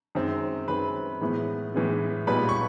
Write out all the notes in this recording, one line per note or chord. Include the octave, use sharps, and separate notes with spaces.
F#2 D#3 G#3 C4
F#2 D#3 G#3 C4 B4 B5
A2 E3 G#3 B3
A2 E3 G#3 B3
A#2 G3 B3 D#4 B4 B5
C#6